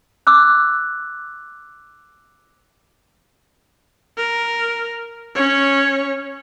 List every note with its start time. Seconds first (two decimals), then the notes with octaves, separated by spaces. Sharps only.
0.27 D6 E6 F#6
4.18 A#4
5.35 C#4 C#5